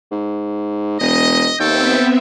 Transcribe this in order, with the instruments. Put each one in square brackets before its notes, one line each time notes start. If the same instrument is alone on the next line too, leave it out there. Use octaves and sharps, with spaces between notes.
[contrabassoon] G#2
[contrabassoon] E1 [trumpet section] D#5
[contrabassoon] D#2 [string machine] B3 C4 E5 [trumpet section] A4 G5